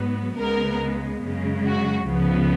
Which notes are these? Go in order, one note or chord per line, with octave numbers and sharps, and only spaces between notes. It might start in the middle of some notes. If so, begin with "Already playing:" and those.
Already playing: G#2 F#3 B3
C#2 C#3 G#3 B3 A#4
F#2 C#3 G#3
F#4
C#2 C#3 F3 B3